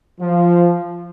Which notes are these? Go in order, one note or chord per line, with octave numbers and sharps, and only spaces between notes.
F3